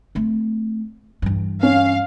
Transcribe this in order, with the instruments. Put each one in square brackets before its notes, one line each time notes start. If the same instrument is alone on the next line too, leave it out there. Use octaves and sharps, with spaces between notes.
[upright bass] A3 C4
G2 E3
[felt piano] C#4 [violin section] F5